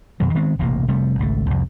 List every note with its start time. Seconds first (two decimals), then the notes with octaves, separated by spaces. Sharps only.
0.20 F2 B2 D#3 F#3
0.35 D#3 G#3 B3 C4
0.59 E1 A1 C3 A#3
0.88 F1 C3 G3 A3
1.19 G#1 C#2 B2 A3
1.50 C2 F2